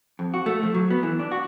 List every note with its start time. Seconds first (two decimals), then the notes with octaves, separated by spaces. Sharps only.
0.19 F2
0.34 F#4
0.46 A3
0.63 F3
0.74 F#3
0.90 B3
1.03 E3
1.19 D4
1.32 F#4